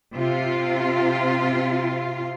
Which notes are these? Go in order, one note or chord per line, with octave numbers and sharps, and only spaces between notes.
C3 F4